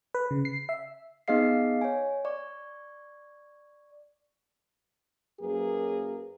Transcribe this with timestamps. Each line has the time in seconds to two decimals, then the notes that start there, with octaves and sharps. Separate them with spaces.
0.15 B4
0.31 C#3
0.45 C7
0.69 E5
1.28 B3 D#4 G#4 D#5 F5 C7
1.81 C#5 G#5
2.25 D5 C#6
5.39 F#2 F#3 A#3 G#4 A#4 B4